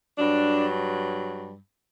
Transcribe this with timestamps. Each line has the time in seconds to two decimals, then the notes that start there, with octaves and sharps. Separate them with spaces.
0.17 G2 F#3 D4